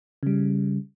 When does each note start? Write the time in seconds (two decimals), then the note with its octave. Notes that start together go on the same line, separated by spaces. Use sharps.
0.23 C#3 G3